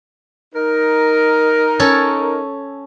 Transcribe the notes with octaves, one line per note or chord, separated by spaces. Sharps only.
D#4 A#4
C#4 A4 C#5